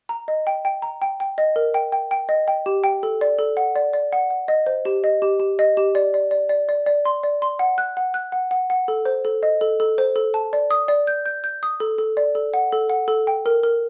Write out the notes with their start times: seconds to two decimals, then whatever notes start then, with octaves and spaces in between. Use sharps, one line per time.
0.09 A#5
0.28 D#5
0.47 G5
0.65 G5
0.82 A#5
1.02 G5
1.20 G5
1.38 D#5
1.56 A#4
1.74 G5
1.92 G5
2.11 G5
2.29 D#5
2.48 G5
2.66 G4
2.84 G5
3.03 A4
3.21 D5
3.39 A4
3.57 F#5
3.76 D5
3.93 D5
4.13 F#5
4.30 F#5
4.48 D#5
4.66 C5
4.85 G4
5.04 D#5
5.22 G4
5.40 G4
5.59 D#5
5.77 G4
5.95 D5
6.14 D5
6.31 D5
6.49 D5
6.69 D5
6.86 D5
7.05 C6
7.23 D5
7.42 C6
7.59 F#5
7.78 F#6
7.97 F#5
8.14 F#6
8.32 F#5
8.51 F#5
8.70 F#5
8.88 A4
9.05 C5
9.25 A4
9.43 D#5
9.61 A4
9.80 A4
9.98 C5
10.16 A4
10.34 A5
10.53 D5
10.71 D#6
10.88 D5
11.07 G6
11.26 G6
11.44 G6
11.63 D#6
11.80 A4
11.98 A4
12.17 D5
12.35 A4
12.54 F#5
12.72 A4
12.90 F#5
13.08 A4
13.27 G5
13.46 A#4
13.63 A#4